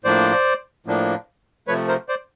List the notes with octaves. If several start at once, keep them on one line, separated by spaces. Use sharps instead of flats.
A2 F3 A#3 D4 C5 D5
A2 F3 A#3 D4
C3 F3 A3 B4 C#5
A#4 C5
C5 D5